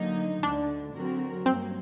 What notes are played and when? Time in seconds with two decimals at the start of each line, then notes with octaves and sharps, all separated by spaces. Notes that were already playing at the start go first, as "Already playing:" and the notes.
Already playing: D3 F#3 A#3 D#4
0.43 D2 D3 A3 D4
0.95 D3 F#3 C4 F#4 A#4
1.46 G2 F#3 A#3 C4